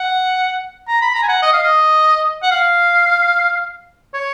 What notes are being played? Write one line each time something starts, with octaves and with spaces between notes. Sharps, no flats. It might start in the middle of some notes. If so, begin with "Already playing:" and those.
Already playing: F#5
A#5
B5
A#5
G#5
F#5
D#5
F5
D#5
F#5
F5
C#5